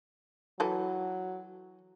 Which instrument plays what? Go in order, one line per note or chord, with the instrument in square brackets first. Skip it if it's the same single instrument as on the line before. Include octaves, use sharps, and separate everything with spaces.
[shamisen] E3 A4 [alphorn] F#3